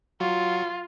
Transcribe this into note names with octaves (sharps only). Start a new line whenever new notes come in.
F#3 F4 F#4